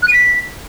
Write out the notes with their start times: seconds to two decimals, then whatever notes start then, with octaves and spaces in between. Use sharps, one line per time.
0.02 F#6
0.08 D#7
0.13 B6